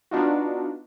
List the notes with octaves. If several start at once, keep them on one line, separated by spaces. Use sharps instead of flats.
B3 D4 D#4 F4 F#4